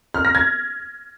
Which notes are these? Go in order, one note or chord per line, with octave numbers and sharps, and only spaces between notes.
F6
A#6
G#6